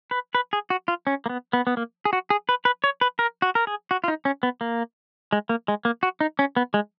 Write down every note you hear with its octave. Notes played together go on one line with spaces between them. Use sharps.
B4
B4
G#4
F#4
F4
C#4
A#3
B3
B3
B3
A#3
G#4
F#4
G#4
B4
B4
C#5
B4
A#4
F#4
A#4
G#4
F#4
F4
D#4
C#4
B3
A#3
G#3
A#3
G#3
A#3
F#4
D#4
C#4
B3
G#3